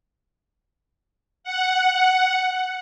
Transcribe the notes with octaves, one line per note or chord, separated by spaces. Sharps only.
F#5